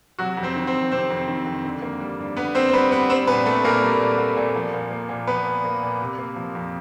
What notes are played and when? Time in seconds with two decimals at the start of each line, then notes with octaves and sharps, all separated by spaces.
0.19 C3 F#3 F#4
0.37 F2
0.43 C4 C5
0.56 D#3
0.67 C4 C5
0.74 F2
0.91 C3 C4 C5
1.10 F2
1.28 D#3
1.46 F2
1.64 D3
1.82 A#3
2.00 G3
2.19 G2
2.37 D3 B3 B4
2.55 A#3 C4 C5
2.69 C5
2.73 G3 B3 B4
2.91 G2 B3 B4
3.09 G3 C4 C5
3.27 A#2 B3 B4
3.46 A3 A#3 A4
3.64 A#2 A#3 A#4
3.83 G3
4.00 A#2
4.18 A#3
4.37 A#2
4.56 F3
4.74 A#2
4.91 A#3
5.09 A#2
5.27 F3 B3 B4
5.47 A#2
5.65 A#3
5.83 A#2
6.01 C3
6.18 A#3
6.36 F3
6.55 F2